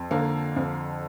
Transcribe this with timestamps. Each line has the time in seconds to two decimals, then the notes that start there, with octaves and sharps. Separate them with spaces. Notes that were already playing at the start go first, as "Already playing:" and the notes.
Already playing: F2
0.11 D3 A#3
0.56 F2